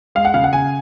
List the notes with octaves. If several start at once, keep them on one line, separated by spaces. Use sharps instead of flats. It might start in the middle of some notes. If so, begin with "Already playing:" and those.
G#3 F5
F#5
C#3 F5
F#5
C#3 G#5